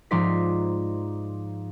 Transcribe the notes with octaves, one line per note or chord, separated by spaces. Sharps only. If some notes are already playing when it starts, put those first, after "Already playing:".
G#2 F3 D#4 D5 C6 B6